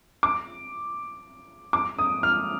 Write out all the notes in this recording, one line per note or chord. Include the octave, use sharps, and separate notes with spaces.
D6
D6
D#6
F6